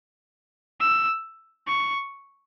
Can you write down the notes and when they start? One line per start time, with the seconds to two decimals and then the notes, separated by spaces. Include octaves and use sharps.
0.80 E6
1.67 C#6